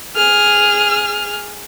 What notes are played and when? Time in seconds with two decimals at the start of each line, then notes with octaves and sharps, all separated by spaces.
0.16 G#4 F6